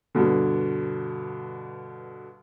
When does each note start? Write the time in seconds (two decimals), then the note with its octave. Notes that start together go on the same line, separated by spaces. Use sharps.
0.15 G2 B2 D3